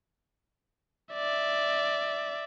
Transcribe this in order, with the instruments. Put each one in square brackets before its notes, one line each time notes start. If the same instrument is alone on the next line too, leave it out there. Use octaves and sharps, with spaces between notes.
[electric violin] D5 E5